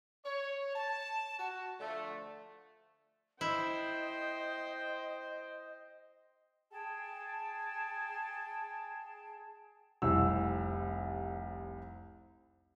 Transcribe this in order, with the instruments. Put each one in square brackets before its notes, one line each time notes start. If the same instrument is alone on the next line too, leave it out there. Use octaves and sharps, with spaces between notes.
[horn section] C#5
A5
F#4
D3 F3 A3
[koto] E4 [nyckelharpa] C5 G5 [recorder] D#5
[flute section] G#4 G5 A5
[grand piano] F1 C2 E6